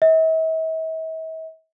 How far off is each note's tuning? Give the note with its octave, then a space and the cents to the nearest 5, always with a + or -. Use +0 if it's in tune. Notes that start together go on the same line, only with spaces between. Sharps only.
E5 -45